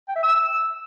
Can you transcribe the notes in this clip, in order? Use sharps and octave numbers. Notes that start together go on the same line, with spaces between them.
G5
E5
E6